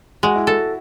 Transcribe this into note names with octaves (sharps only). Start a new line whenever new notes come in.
G#3 F#4
E4
F#4 A4